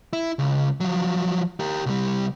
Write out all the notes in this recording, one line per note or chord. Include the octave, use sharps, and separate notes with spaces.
E4
C#2
F3 F#3
G4 A#4
C2 G3